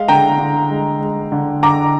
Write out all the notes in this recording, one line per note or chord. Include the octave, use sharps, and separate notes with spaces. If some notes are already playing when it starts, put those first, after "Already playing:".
Already playing: G#3 F5
D3 G5 A#5
D3
G#3
G#3
D3
D3 A#5 D6